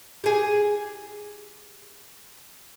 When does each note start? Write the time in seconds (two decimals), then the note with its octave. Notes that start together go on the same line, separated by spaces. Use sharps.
0.24 G4 G#4